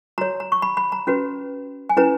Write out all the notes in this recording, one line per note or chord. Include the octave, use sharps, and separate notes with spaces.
F#4 C#5 A#5
A#5
C#6
B5
B5
A#5
C#4 F#4 B4
G#5
C#4 E4 B4 A#5